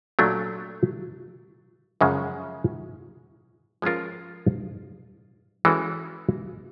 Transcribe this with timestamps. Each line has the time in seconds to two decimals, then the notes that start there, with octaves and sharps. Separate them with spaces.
0.19 A#2 F#3 A3 D4
2.01 F#2 C#3 F3 G#3
3.82 F3 G#3 C#4 F4 A#4
5.65 E3 G#3 C#4 F#4 A4